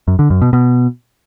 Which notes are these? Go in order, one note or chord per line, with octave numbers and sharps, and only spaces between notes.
F#2
D3
F#2
B2
B2